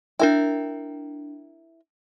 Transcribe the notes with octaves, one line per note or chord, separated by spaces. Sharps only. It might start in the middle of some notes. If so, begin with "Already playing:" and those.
D4 E4 A#4 G5